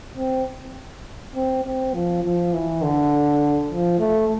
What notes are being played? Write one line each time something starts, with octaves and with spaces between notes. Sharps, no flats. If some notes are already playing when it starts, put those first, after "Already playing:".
C4
C4
C4
F3
F3
E3
D3
F3
A3